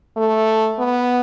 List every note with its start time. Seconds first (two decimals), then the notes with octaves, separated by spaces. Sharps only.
0.17 A3
0.79 B3